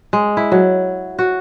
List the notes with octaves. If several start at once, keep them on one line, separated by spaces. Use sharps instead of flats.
G#3
E4
F#3
F#4